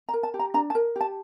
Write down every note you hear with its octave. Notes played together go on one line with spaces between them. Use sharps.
A#5
A#4
A5
G4
A#5
D4 A#5
A5
A#4
G4 A5